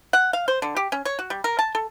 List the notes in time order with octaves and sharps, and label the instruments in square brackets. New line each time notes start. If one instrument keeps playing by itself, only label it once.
[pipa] F#5
F5
C5
D3
G4
C#4
C#5
F#4
G3
A#4
A5
A4